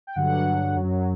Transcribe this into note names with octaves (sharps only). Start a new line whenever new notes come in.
G5
G2 D3 F#3 F#5
F#2 F#3